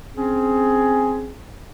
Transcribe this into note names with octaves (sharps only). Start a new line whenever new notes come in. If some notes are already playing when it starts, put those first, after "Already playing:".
C4 C#4 G#4